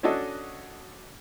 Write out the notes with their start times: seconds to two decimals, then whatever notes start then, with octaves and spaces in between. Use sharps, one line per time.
0.03 C#4 D4 F#4 A4 D#5